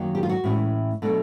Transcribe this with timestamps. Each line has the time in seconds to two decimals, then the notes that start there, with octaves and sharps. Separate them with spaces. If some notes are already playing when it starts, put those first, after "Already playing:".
Already playing: F#2 D#3 F#3 A#3
0.15 G4
0.23 F4
0.29 F#4
0.44 A2 E3 G#3 C#4
1.02 B2 F#3 A3 D4